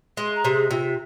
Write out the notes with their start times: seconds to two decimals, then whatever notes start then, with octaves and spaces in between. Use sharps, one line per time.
0.17 G#3 C6
0.35 A#5
0.45 C3
0.53 G#4
0.71 C3 F4